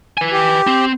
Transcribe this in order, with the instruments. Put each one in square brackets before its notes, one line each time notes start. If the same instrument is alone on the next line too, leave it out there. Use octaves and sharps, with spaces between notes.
[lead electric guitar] B4 G#5
[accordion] G4
[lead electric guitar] C4